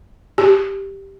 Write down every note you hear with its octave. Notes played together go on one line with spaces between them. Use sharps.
G4